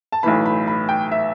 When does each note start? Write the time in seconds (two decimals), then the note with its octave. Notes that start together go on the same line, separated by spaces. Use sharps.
0.12 A5
0.23 B1 A2 E3 B5
0.46 B5
0.68 B5
0.89 G5
1.12 E5